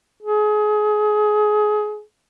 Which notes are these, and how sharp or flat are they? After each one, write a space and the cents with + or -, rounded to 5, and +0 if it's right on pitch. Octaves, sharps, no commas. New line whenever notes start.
G#4 +25